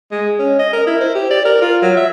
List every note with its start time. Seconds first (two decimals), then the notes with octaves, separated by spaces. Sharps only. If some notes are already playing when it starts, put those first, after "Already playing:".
0.12 G#3
0.39 C#4
0.59 D#5
0.73 A#4
0.87 E4
1.01 C5
1.15 G4
1.31 D5
1.45 A#4
1.62 F4
1.82 F#3
1.97 E5